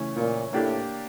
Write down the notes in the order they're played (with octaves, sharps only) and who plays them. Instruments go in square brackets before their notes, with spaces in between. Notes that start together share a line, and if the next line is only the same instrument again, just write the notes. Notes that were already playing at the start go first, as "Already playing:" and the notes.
Already playing: [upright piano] C#3 E3 A3 C#4
[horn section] A#2
[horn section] A2 [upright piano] A#3 D4 G4 D5